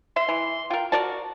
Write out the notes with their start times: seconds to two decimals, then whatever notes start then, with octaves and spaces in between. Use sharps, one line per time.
0.16 E5 C6
0.28 E3
0.70 F4 A#4 G5
0.92 F#4 A#4 D5 A5